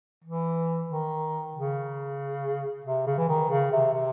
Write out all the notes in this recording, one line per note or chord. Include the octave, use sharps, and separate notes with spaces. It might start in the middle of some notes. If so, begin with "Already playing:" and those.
E3
D#3
C#3
C3
C#3
E3
D#3
C#3
C3
C3